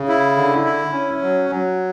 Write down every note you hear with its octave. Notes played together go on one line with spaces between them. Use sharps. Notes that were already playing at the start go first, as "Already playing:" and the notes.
Already playing: C#3
E4
D3
E4
C#4
F#3
F#3